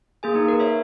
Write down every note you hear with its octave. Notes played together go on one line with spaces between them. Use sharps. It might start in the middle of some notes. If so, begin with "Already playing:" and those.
A#3 G#4 G#5
A#3 D#4
A#4 B4
C#5 E5